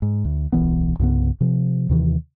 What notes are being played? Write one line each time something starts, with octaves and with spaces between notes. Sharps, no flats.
G#2
D2
D1 B1 E3 B3
C2 G2 C#3 B3
C3 F3
D#2 C3 D#3 E3